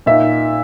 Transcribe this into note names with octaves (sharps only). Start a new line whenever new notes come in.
A#2 A#3 D#4 E5